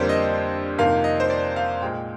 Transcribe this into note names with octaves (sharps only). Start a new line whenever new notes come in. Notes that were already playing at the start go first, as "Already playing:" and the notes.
Already playing: F2 D3 G3 A#3 C5 D5
D#5
F2 C3 D#3 A#3 F5
D#5
C5
D5
F5
A#2 G#3 G5